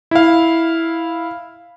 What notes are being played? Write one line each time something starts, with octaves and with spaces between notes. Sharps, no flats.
E4 F5